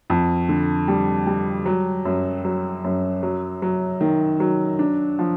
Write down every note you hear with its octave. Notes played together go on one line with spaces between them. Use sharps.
F2
D3
G3
G3
F#3
F#2
F#3
F#2
F#3
F#3
D#3
F#3
D4
F3